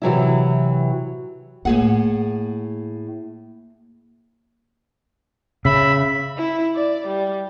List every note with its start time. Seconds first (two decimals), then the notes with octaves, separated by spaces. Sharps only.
0.02 C3 E3 F#3 E4
1.65 A2 A#3 G#4 F#5
5.65 C#3 E5 B5
6.38 E4
6.76 D5
7.08 G3